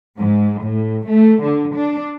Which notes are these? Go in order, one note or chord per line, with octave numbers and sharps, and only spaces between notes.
G#2
A2
A3
D3
D4